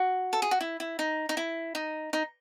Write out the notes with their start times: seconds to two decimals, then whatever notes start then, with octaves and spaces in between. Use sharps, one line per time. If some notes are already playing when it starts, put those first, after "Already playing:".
Already playing: F#4
0.33 A4
0.42 G#4
0.51 F#4
0.61 E4
0.80 E4
0.99 D#4
1.29 D#4
1.37 E4
1.75 D#4
2.13 D#4